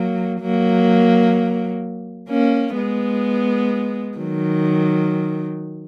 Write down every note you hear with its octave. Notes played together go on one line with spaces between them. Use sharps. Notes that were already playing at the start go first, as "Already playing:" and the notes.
Already playing: F#3 A#3
F#3 A#3
A#3 C#4
G#3 B3
D#3 F#3